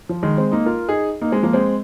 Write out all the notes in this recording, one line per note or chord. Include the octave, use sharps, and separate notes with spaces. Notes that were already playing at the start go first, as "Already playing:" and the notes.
F3
D#3 G#3
G#3 C4
A#3 D#4
F4 A#4
D#4 G#4
A#3 D#4
G#3 C4
F3 A#3
G#3 C4